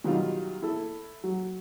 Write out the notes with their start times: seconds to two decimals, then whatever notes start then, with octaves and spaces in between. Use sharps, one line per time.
0.04 B2 D#3 F#3 G3 F4
0.62 E4 A4
1.24 F#3